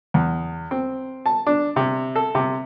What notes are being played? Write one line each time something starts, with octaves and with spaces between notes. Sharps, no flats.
E2
C4
A5
D4
C3
A4
C3